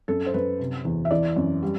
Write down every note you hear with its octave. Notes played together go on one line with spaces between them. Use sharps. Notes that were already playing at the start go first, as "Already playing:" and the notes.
F#2 A4
C5
F#2 B4
C3
E2
E5
E3 D5
F#2
G3